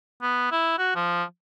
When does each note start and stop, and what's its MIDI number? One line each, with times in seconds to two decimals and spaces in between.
0.22 0.48 59
0.52 0.75 64
0.79 0.95 66
0.96 1.23 53